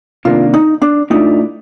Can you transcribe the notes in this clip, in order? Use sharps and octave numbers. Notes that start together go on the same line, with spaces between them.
C3 D#3 A#3 D4 F4
D#4
D4
A2 A3 D4 D#4 F4